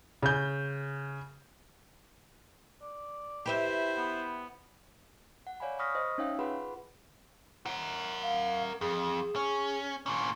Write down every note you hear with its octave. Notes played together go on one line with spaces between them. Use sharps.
C#3 G6
D5
E4 G4 B4 C5 E5
B3
F#5
C#5 D5 F5 G#5 B5
B5 C#6 D#6 F6 A#6 B6
C5 D#5 D#6 A#6
C#4 D#4 C#5 E5 F5 G5
F4 G#4 B4 F#5 B5 C6
A#4 F#5
F5
F2 G#4
C#4
A#2 C#4